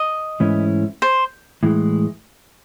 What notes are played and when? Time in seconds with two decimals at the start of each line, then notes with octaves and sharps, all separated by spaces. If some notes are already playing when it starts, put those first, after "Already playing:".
Already playing: D#5
0.40 G#2 E3 A3 C#4 E4
1.02 C5
1.63 A2 E3 G#3